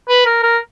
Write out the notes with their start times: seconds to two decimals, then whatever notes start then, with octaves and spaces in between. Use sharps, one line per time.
0.09 B4
0.26 A#4
0.43 A#4